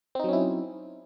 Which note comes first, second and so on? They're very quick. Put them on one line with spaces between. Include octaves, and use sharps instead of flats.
C4 D#4 F#3 C#4 E4